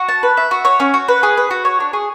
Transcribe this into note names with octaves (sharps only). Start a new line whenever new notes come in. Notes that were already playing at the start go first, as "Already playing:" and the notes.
Already playing: F#4
A5
B4
E5
F#4
C#5
C#4
F#4
B4
G#4
B4
F#4
C#5
D4
G#4